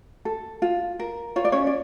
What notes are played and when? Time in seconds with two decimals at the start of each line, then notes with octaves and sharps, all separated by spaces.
0.25 A4
0.62 F4
0.99 A#4
1.36 F4 C#5
1.45 D5
1.52 C#4 C#5
1.67 D5